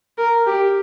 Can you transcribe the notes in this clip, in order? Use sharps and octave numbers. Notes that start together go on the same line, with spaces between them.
A#4
G4